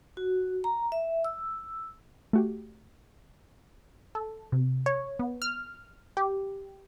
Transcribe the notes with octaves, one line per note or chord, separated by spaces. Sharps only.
F#4
A#5
E5
E6
A3 F#4 G4
A4
C3
C#5
B3
F6
G4